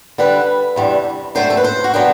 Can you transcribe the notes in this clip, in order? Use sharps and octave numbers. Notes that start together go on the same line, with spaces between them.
D3 G3 D4 B4
E2 C3 G3 D4
C3 F#3 A3 D4 C5
A4
B4
C5
F#4
C3 F#3 B3 D4 G4